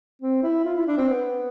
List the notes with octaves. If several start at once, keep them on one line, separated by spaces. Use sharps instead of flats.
C4
E4
F4
E4
D4
C4
B3